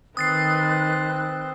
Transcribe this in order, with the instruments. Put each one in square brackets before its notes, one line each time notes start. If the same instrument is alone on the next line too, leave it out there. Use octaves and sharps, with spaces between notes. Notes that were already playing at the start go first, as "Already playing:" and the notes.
[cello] D#3 [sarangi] C4 [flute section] B4 F#6 [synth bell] D#6 A6 C7